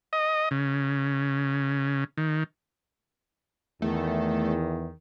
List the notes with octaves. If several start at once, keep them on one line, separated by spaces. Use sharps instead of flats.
D#5
C#3
D#3
E2 D#3 A3